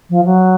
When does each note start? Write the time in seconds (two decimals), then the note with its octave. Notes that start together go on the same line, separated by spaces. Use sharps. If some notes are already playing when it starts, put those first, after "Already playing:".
0.10 F3
0.25 F#3